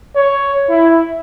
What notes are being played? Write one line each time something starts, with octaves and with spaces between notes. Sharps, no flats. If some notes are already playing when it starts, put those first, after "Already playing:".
C#5
E4